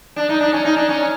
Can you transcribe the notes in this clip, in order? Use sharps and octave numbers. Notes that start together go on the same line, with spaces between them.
D4
D#4
D4
C#4
D#4
D4
C#4